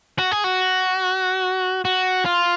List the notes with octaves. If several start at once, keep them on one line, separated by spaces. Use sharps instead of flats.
F#4
G#4
F#4
F#4
F4